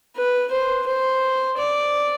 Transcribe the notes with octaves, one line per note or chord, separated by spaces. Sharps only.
B4
C5
C5
D5